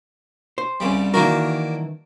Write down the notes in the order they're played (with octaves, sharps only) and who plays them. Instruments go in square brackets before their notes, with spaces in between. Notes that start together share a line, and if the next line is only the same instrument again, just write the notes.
[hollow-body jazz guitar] C5
[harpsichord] C2 C#3 G3
[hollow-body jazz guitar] D#3 E3 A#4 [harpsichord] A#3 D4 F#4